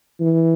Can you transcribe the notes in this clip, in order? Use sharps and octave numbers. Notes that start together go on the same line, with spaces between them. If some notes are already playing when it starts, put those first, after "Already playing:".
E3